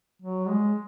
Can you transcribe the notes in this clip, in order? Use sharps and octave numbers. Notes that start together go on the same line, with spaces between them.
F#3
G#3